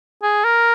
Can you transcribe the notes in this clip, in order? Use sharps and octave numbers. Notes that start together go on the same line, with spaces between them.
G#4
A#4